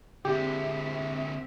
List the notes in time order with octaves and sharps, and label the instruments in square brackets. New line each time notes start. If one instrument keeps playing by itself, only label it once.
[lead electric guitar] D3 G#3 [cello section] C4 E5 [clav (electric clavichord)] G4